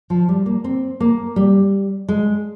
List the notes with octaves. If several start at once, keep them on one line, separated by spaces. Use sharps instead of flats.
F3
G3
A#3
C4
A#3
G3
G#3